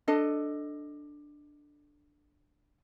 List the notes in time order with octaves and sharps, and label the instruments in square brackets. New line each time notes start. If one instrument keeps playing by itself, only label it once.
[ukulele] D4 A4 D#5